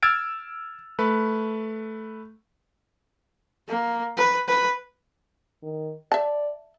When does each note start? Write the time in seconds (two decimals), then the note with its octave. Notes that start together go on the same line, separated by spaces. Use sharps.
0.03 E6 F6 G#6 A6 D7
0.99 A3 B4
3.68 A#3
4.17 B4
4.48 B4
5.63 D#3
6.12 D5 E5 A5